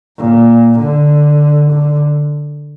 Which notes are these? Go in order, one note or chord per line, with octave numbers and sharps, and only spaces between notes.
A#2
D3
D3